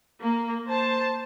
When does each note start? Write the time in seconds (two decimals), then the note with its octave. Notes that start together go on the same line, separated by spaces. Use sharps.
0.21 A#3
0.67 C5 A5